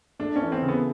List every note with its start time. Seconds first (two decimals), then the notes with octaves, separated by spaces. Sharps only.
0.19 A3 D4
0.36 C#4
0.42 E3
0.52 C4
0.62 C#3
0.68 B3